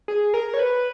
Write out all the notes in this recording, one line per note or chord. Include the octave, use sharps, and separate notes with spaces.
G#4
A#4
C#5
B4